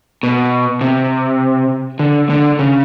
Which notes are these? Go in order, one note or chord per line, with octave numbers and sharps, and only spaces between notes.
B2
C3
D3
D3
C#3